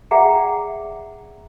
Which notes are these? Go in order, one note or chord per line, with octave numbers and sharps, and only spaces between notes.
G#4 D5 E5 F#5 G5 A#5